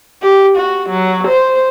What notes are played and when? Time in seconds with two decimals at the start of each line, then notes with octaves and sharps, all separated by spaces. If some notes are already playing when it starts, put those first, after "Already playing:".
0.22 G4
0.57 F#4
0.89 F#3
1.27 C5